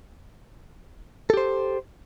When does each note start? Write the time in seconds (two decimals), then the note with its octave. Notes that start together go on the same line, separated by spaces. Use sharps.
1.30 A4
1.34 G4
1.37 C5